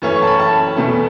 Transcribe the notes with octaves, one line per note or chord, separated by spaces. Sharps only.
F#2 E3 A3 C#4 C#6
C#6
A5
B5
A5
E2 B2 A3